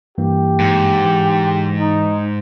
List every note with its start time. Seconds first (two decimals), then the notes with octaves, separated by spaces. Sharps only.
0.18 G2 E3 A#3 G4
0.60 G#2
1.05 E3
1.80 D#4